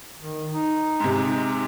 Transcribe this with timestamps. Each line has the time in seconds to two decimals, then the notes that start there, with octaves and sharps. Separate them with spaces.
0.19 D#3
0.52 D#4
1.00 G#2 C3